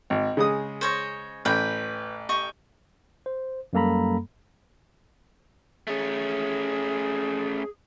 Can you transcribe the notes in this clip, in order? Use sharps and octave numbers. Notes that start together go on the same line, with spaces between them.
G#1
C#3 G#3 D#6
C5 C#5 D#5
A1 B4 G5
G4 D#5 C#6
C5
F#2 G3 A#3 A4 A#5 B5
A3 C#4 G#4